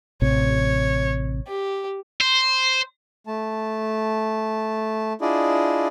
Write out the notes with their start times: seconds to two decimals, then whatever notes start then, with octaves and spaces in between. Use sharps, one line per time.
0.22 A1 C3 C#5
1.47 G4
2.21 C5
3.27 A3 A5
5.21 D4 E4 F4 G#4 D5 D#5